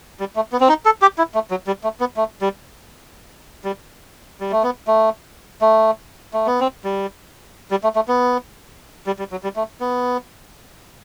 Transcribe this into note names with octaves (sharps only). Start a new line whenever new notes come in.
G3
A3
B3
C4
D#4
A4
G4
E4
A3
F#3
G3
A3
B3
A3
G3
G3
G3
A3
B3
A3
A3
A3
B3
C4
G3
G3
A3
A3
B3
G3
G3
F#3
G3
A3
B3